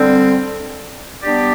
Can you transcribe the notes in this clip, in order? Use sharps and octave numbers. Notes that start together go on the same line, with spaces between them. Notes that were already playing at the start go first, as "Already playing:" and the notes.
Already playing: D3 G3 C4
G3 B3 D4 G4 D5